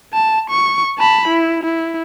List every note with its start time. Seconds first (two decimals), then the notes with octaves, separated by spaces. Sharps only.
0.13 A5
0.50 C#6
0.99 A5 B5
1.28 E4
1.63 E4